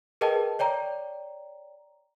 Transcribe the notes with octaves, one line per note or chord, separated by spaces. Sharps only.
G#4 A#4 B4 D#5 G5 A5
C#5 D5 G5 A#5